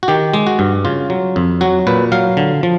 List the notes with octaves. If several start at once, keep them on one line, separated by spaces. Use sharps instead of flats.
F#4
D#3 G4
G#3
F#4
G2
C#3 F4
F#3
F2
F#3 F#4
A#2 B4
F#3 F5
D3
F3